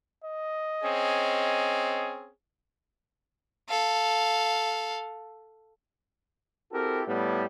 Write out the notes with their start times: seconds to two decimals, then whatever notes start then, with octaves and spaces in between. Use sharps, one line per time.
0.24 D#5
0.83 C4 C#4 G#4
3.69 A4 F5
6.72 C4 E4 F#4 G4 A4 A#4
7.06 A2 G3 B3